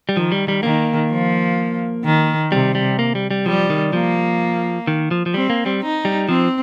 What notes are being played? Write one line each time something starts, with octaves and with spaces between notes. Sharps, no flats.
G3
D#3 F3
G3
G3
D#3 A#3
F3
D#3
C3 G3
G3
A#3
G3
G3
F3 G3
D#3
F3 A#3
D#3
F3
F3
G3 C4
A#3
G3
D#4
G3
F3 C4